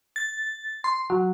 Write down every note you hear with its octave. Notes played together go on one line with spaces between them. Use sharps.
A6
C6
F#3